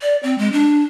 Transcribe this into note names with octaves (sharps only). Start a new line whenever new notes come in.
D5
C4
G#3
D4